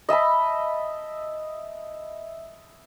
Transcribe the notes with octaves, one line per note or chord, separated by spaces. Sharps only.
D#5 E5 A5 B5